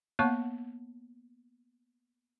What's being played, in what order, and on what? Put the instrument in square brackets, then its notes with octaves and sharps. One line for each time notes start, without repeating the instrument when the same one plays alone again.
[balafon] A#3 B3 C#5 F5 A5 C#6